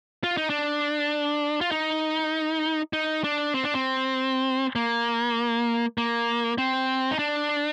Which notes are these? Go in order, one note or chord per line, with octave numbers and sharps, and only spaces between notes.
F4
D#4
D4
F4
D#4
D#4
D4
C4
D4
C4
A#3
A#3
C4
D#4
D4